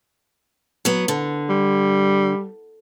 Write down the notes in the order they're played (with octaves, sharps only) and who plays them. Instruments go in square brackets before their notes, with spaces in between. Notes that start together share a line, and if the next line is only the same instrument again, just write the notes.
[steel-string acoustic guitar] F#3 B3
D3
[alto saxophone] G3